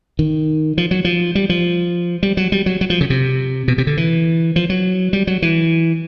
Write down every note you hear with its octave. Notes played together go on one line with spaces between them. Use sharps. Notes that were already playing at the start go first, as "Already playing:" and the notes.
D#3
F3
F#3
F3
G3
F3
G3
F#3
G3
F#3
F#3
F3
C#3
C3
B2
C3
D3
E3
F3
F#3
G3
F#3
E3